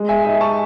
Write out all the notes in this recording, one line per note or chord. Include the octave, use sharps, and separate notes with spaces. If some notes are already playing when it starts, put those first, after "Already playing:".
Already playing: G#3
E5 G#5
D#4 E5
A5 C#6